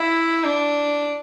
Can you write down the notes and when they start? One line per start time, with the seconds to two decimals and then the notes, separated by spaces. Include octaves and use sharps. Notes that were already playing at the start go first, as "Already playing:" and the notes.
Already playing: E4
0.44 D4